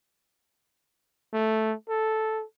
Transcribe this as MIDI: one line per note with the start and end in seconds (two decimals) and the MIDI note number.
1.33 1.74 57
1.88 2.44 69